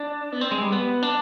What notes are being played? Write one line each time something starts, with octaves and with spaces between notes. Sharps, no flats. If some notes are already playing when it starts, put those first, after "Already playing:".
Already playing: D4
B3
C4
G#3
G3
B3
D4